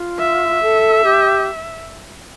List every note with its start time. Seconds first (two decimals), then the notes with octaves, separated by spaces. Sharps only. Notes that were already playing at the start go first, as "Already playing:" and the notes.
Already playing: F4
0.19 E5
0.62 A4
1.03 G4